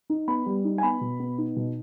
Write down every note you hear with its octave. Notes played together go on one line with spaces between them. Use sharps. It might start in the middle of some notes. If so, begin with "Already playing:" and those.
D#4
B3 B5
G3
D#4
G#5
B3 B5
B2
B3
D#4
B2